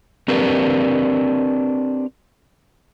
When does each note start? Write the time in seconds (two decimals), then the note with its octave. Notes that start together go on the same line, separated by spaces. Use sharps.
0.28 C4 D4 G4 A#4 B4